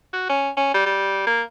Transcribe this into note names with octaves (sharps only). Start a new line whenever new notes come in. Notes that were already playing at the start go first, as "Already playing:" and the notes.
F#4
C#4
C#4
G3
G3
A#3